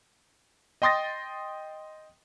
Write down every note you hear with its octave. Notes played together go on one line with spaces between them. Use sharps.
D#5 G5 C6 D#6 A6 A#6